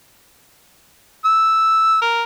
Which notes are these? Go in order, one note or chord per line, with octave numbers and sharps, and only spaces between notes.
E6
A#4